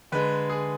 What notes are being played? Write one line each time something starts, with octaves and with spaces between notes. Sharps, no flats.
D3 G#3 B4
G#4